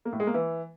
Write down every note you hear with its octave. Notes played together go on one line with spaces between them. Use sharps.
A#3
A2
G#3
A#3
E3